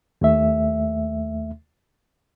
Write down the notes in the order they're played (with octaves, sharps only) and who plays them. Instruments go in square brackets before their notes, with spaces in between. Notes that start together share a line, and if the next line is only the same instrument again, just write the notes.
[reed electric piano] D#2 A3 E5